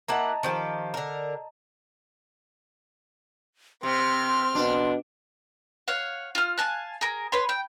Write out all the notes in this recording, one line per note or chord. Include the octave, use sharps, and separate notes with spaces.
A#3 E4 D#5 F#5 A5 A#5
D#3 F3 G4
D3 A#4
C3 C4 C6 F6
B2 D4
C#5 F5 F#5
F4 F6
F5 G#5 A5 F#6
G#4 A#4
B4 C#5 C6
G5